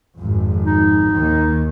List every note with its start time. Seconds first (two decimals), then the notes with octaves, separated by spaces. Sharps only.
0.20 G#1 F2
0.65 D#4
1.10 D#2 D#3